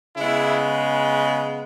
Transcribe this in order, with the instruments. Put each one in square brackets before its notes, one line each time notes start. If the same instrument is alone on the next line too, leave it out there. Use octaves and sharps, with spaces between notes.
[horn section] C#3 G#3 B3 E4